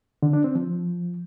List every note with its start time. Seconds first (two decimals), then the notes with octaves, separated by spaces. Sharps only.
0.22 D3
0.33 D4
0.44 C4
0.55 F3